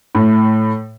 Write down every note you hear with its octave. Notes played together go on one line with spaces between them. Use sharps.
A2